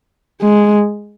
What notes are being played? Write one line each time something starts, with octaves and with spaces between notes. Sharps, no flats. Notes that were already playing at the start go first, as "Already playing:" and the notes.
G#3